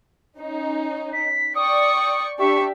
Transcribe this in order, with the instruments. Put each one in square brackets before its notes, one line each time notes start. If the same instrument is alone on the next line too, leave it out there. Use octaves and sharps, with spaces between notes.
[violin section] C#4 D#4
[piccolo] B6
[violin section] D5 G5 C#6 [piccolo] D#6
[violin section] D4 G4 E5 [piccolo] C#6